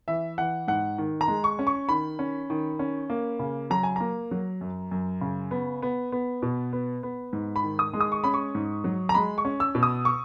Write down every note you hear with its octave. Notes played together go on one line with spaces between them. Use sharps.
E3 E5
E3 F#5
G#2 F#5
D#3
A#5
G#3
C#6
C#4
C#6
D#3 B5
C#4
D#3
C#4
A#3
C#3
F#3 A#5
G#5
A#3 A#5
F#3
F#2
F#2
C#3
B3
B3
B3
B2
B3
B3
G#2
B5
D#3
D#6
G#3
D#6
C#6
C#4 B5
C#6
G#2
F#3
A#5
G#3 B5
C#6
C#4
E6
B2
D#6
C#6